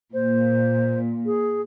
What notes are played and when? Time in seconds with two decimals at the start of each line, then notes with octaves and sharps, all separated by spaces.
0.13 A#2 C5
1.25 G#4